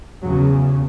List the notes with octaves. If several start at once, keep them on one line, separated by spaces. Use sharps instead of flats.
E2 C#3 F#3